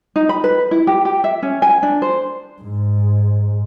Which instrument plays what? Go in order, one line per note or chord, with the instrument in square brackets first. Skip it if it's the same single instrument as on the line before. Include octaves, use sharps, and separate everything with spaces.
[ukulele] D#4
B5
B4
E4
G4
G4
E5
C#4
G#5
D4
C5
[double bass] G#2